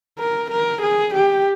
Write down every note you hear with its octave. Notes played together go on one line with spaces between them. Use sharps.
A#4
A#4
G#4
G4